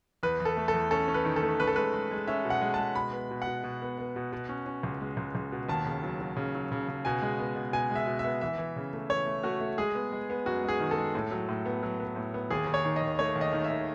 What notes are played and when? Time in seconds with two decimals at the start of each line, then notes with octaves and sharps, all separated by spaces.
0.23 E2 B4
0.40 E2
0.45 A4
0.57 A3
0.68 A4
0.74 E2
0.91 C#4 A4
1.08 C#4
1.14 B4
1.25 D#3
1.36 A4
1.43 A3
1.60 C#4 B4
1.67 A4
1.76 G#3 B4
1.93 G#3
2.11 G#3
2.27 C#4 E5
2.45 B2
2.50 F#5
2.61 G#3
2.74 G#3 A5
2.95 B2 B5
3.13 B3
3.31 B2
3.42 F#5
3.47 B2
3.64 B2
3.82 B3
3.98 B3
4.16 B2
4.33 B2
4.49 C#4
4.66 C#4
4.83 C#2
5.01 G#3
5.17 C#2
5.35 C#2
5.52 B2
5.69 D#2 A5
5.86 C#3
6.03 F#3
6.20 F#3
6.37 C#3
6.54 F#3
6.72 C#3
6.88 C#3
7.05 B2 G#5
7.22 G#3
7.39 B3
7.56 B2
7.73 B2 G#5
7.91 G#3 E5
8.07 B2
8.19 E5
8.24 B3
8.41 E3 E5
8.58 E3
8.76 C#3
8.93 A3
9.10 E3 C#5
9.26 A3
9.43 A3 F#4
9.60 A3
9.78 G#3 G#4
9.95 B3
10.12 G#3
10.30 B3
10.46 F#2 F#4
10.63 G#3
10.68 G#4
10.80 D#3
10.91 A4
10.98 G#3
11.15 A2
11.31 F#3
11.49 A2
11.66 B3
11.83 F#3
12.00 B3
12.16 A2
12.34 B3
12.50 D#2 G#4
12.67 D#2
12.74 C#5
12.85 D#3
12.96 D#5
13.02 D#2
13.19 A3 C#5
13.36 D#2
13.41 D#5
13.53 D#3
13.64 E5
13.70 D#3